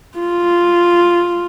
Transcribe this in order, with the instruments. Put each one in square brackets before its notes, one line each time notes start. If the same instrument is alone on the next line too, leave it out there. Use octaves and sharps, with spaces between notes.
[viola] F4